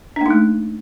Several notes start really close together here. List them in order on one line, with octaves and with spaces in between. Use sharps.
D4 A#3 D#4 A3